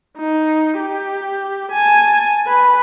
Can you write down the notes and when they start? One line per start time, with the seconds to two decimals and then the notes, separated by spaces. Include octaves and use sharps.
0.18 D#4
0.80 G4
1.72 G#5 A5
2.47 B4